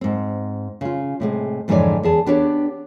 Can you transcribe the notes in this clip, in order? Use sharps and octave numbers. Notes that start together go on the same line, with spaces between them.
G#2 C4
C#3 F4
A2 C3 G#3
F2 G#2 D3 E3 C#5 D5
E2 G#4 A5
B3 D4 G4 C#5